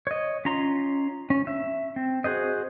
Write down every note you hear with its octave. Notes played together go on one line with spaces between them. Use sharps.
C#5 D#5
C#4 F4 A#5 C6
C#4
E5
C4
F#4 G#4 C5 D#5